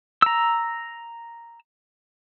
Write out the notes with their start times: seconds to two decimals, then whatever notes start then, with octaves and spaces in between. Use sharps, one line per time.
0.22 A#5 E6